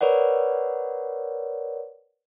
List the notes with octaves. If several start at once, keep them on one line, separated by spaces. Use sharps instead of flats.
A#4 B4 C#5 D5 F#5